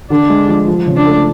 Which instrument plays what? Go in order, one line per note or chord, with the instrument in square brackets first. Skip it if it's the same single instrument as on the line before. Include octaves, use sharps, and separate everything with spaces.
[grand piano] D3 [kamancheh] D4
[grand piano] G#3
F3
F3
C#3
[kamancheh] D4
[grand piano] A3